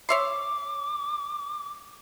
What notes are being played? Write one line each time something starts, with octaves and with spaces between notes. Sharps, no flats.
C#5 E5 C6 D6